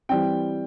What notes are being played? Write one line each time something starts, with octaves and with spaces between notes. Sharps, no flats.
E3 G3 C4 G5